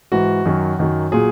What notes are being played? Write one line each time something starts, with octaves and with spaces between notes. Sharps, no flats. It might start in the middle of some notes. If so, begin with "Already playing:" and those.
G#2 E3 F#4
F#2 D#3 F#3
F#2 D#3 F#3
A#2 F#3 G#4